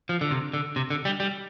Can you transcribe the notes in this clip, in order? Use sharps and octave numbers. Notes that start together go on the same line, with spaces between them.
F3
D3
C3
D3
C3
D3
G3
G3